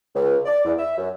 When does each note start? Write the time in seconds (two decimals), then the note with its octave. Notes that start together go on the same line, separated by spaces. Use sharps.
0.15 C#2
0.45 D5
0.65 E2
0.78 E5
0.97 F#2